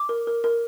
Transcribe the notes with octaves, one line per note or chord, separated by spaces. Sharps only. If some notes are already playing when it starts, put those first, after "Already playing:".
Already playing: D6
A#4
A#4
A#4